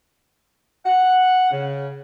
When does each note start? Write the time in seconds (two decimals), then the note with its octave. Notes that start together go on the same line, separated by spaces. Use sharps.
0.86 F#5
1.51 C#3